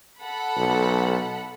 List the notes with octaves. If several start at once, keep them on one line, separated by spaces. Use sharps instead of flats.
A4 F#5 B5
B1